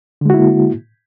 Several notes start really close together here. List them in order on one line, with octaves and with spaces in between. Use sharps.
D3 G#3 F#4 E4 A#3